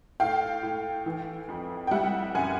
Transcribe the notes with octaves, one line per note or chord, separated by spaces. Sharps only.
A2 F5 G5
A2
E3
F2
G5
G3 E5 F#5
F#2 F#5 G#5